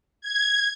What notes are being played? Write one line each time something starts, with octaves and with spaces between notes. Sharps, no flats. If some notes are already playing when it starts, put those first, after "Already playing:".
G#6